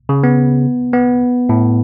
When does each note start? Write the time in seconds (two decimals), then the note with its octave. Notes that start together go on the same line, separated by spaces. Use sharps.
0.09 C#3
0.24 B3
0.93 B3
1.49 A2